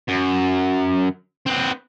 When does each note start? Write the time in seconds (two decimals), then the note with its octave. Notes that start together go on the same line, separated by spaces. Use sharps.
0.08 F#2
1.46 C4 B4